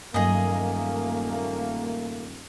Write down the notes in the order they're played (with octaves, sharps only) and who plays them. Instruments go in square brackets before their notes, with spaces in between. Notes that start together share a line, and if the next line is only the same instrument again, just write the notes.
[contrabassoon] D#1 [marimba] G2 F#3 [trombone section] A3 A#3 [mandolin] G#4 D#5